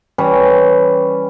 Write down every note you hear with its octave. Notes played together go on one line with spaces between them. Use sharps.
E3 G3 C#4 B5